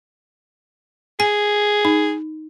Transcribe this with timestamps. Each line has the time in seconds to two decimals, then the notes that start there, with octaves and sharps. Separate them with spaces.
1.20 G#4 G#5
1.85 D#4